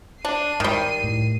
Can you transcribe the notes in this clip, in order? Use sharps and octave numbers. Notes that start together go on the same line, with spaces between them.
D4 C7 D#7
G#2 D#3 G3
A2